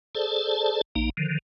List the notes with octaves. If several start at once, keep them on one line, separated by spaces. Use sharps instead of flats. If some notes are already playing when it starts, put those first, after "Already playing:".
G#4 A4 C5 D5 A5
A#1 A#3 D#4
D3 D#3 F3